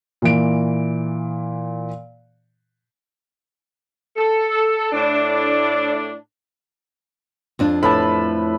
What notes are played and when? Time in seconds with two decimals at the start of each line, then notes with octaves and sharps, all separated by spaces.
0.22 A#2 E3 D7
4.17 A4
4.92 A2 D4
7.59 F2 F3 D4
7.83 A2 B4 A5 B5